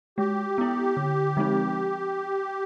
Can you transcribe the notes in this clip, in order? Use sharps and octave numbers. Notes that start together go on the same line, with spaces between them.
G#3 G4
B3 E4
D3
F3 G#3 C4 D#4